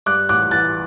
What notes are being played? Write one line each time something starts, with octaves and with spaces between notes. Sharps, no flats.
G2 D6 F#6
A1 D6 F#6
E3 F#6 A6